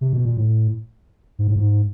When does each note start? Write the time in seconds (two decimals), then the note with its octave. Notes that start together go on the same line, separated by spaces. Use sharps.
0.01 C3
0.13 B2
0.25 A#2
0.37 A2
1.39 G#2
1.48 A2
1.56 G#2